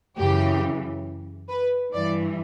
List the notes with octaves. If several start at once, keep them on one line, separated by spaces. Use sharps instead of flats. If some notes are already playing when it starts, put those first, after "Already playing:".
F#2 C#3 E3 G4
B4
G2 E3 D5